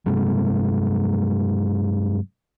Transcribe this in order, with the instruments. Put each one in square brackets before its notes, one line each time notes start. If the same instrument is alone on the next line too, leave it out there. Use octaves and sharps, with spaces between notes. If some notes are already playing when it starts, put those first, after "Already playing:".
[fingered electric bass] G2 C3 F#3 G#3